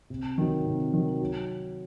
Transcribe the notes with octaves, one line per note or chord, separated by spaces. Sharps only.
C3
D#3 F#3
C3
D#3 F#3
F#3